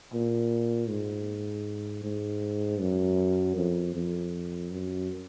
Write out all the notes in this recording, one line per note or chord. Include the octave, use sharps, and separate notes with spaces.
A#2
G#2
G#2
F#2
F2
F2
F#2